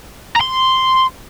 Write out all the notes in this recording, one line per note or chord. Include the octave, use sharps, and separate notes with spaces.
A#5 C6